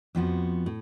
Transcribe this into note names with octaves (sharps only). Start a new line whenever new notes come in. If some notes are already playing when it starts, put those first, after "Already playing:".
F2 F3 B3 F#4
A2